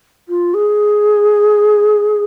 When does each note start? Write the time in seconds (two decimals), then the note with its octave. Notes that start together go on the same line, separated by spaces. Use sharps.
0.28 F4
0.54 G#4